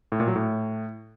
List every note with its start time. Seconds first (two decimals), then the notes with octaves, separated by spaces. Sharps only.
0.12 A2
0.20 A#2
0.28 F#3
0.36 A2